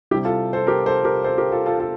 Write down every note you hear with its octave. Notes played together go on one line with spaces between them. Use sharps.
C3 G3 E4 G4
F4 A4
A4 C5
G4 A#4
A4 C5
G4 A#4
A4 C5
G4 A#4
F4 A4
F4 A4
F4 A4